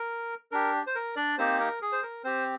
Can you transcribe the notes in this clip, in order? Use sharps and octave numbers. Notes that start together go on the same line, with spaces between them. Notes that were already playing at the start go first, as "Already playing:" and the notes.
Already playing: A#4
D4 G4 A#4
C5
A#4
D4 D5
A#3 C4 D#4 G4 C5
A#4
G#4
C5
A#4
C4 G4 C5